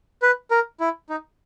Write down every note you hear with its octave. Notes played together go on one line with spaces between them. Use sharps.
B4
A#4
E4
D#4